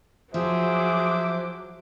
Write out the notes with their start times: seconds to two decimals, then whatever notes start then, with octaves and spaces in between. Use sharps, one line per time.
0.34 F3 F#3 G#4 C5 E5 D6